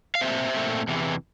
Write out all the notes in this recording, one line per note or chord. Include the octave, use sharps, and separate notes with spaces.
F5
A#2 A3 C4 C5 E5
A#2 A3 C4
E2 C3 E3